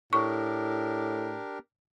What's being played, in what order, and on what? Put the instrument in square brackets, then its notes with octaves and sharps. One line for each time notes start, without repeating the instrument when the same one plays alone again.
[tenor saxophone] A2 [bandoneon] D4 G4 A#4 [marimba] C#6